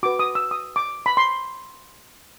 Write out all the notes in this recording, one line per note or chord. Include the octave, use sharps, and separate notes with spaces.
F#4 B4 D6
D#6
E6
D#6
D6
B5
C6